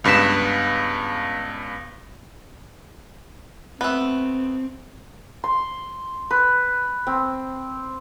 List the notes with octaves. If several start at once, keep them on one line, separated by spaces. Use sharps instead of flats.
C#2 G2 B3 B6 E7
A3 B3 C4
C6
B4
C4